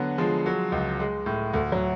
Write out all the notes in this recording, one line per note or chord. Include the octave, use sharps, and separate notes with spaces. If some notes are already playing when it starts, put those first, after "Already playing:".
Already playing: D3 F#3 B3
F3 G#3
F#3
C#2
G#3
A2
D2 A3
F#3